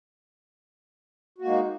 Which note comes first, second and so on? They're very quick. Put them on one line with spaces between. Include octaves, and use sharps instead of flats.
F#4 A#3 G#3 D#4